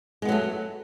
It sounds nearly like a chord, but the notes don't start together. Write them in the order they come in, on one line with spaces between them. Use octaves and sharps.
G#3 B3 F#3 A3